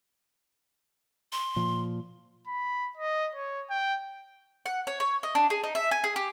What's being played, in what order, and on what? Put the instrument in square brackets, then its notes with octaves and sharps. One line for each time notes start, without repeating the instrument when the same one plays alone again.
[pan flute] C6
[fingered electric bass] A#2 F3
[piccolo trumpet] B5
D#5
C#5
G5
[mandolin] F#5
C#5
C#5
D#5
D4
G#4
D#4
E5
G#5
G#4
G4